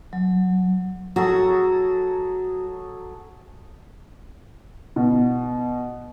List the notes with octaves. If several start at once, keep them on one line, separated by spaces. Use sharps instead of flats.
F#3
F#3 F#4 G#4 A4
B2